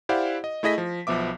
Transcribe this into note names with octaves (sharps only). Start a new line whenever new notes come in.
E4 G4 C5 D5 F5 F#5
D#5
A3 E4 G#4 D#5 A#6 B6
F3
B1 F3 B3 E5 D6